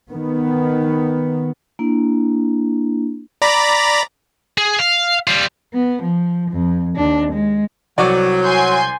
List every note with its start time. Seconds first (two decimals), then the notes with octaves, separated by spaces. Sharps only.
0.12 D#3 B3
1.79 A#3 D4 E4
3.42 D5 A#5 B5
4.58 G#4
4.79 F5
5.27 G3 F4
5.73 B3
6.02 F3
6.51 F2
6.96 D#2 D4
7.33 G#3
7.98 C2 F#3 D5 C#6
8.44 G#5 C6 G6